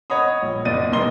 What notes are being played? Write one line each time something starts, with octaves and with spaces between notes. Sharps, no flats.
C#5 D#5 F#5 B5 D#6
A#1
F#1 D5 D#5 A6 D#7
E1 D#2 A#3 D#5 C6 G7